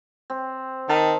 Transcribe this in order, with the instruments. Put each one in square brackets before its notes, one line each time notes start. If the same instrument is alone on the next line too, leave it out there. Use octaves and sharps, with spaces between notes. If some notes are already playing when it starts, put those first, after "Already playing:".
[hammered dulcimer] C4
[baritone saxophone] D#3 [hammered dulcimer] A5